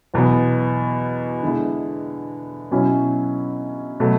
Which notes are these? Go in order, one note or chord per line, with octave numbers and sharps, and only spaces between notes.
E2 B2 F#3 B3
D3 G#3 B3 E4
B2 F#3 C#4 E4
B2 F#3 A3